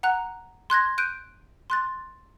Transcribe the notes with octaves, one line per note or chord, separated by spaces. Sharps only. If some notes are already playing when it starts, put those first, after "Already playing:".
F#5 A#5 F#6
C6 F#6 G#6 A#6
F#6 G6 D7 D#7
C6 F#6 A6